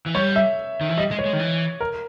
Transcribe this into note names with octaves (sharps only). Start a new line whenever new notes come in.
E3
G3 C#5
E5
D#3
E3
G3 D#5
G#3
C#5
G#3
D#3
E3
A#4